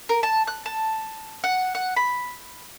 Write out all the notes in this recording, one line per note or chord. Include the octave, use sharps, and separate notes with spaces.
A#4
A5
F#6
A5
F#5
F#5
B5